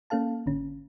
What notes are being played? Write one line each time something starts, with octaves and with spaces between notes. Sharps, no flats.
A#3 C#4 A4 F5 A5
G#1 D3 C#4